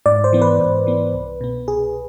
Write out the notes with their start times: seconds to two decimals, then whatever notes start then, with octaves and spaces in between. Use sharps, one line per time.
0.06 G#2 D5
0.24 C5
0.33 E3 B3
0.42 B4
0.60 G#2
0.87 E3 B3
1.13 C2
1.41 B2 B3
1.68 C2 G#4